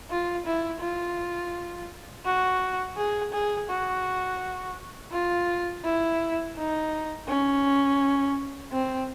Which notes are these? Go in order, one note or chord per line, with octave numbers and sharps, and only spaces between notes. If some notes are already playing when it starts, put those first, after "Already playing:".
F4
E4
F4
F#4
G#4
G#4
F#4
F4
E4
D#4
C#4
C4